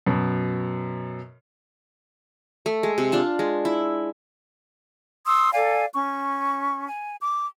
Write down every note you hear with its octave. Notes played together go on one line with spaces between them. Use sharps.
F#2 B2
A3
G#3
C3
D4 F4 A5
G#3
E4
C6 D#6 E6
A4 D5 F5 G#5
C#4 C#6
G#5
D6